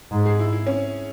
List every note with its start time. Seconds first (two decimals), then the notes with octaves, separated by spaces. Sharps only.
0.12 G#2
0.25 G#4
0.39 E4
0.53 E4
0.67 C#4